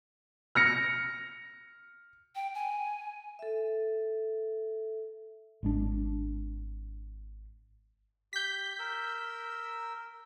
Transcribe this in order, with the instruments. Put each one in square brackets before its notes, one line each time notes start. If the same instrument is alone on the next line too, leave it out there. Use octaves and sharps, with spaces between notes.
[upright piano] F6 A#6 C#7
[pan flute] G5
G#5
[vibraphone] A4 E5
[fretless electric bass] G#1 G#3 D4
[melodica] G4 [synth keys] G6 B6
[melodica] A#4 E6